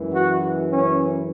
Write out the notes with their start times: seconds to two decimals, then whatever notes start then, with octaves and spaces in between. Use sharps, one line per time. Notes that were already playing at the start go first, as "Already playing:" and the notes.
Already playing: F#2 E3 G#3
0.14 F#4
0.71 C#4